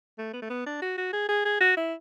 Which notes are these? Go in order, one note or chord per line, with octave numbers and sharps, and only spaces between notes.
A3
B3
A3
B3
D4
F#4
F#4
G#4
G#4
G#4
F#4
E4